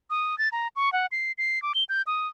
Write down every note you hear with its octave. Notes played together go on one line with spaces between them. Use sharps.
D#6
A6
A#5
C#6
F#5
C7
C7
D6
G7
G6
D#6